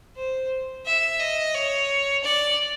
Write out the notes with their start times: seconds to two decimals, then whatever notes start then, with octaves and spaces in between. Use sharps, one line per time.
0.17 C5
0.86 E5
1.20 D#5
1.54 C#5
2.24 D5